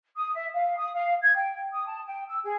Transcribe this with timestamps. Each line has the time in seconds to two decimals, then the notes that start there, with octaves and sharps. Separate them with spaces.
0.15 D#6
0.34 E5
0.54 F5
0.77 D#6
0.94 F5
1.22 G#6
1.34 G5
1.72 D#6
1.86 A5
2.06 G5
2.27 E6
2.43 G#4